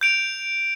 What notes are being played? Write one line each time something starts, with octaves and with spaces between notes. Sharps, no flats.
G6 D7 F7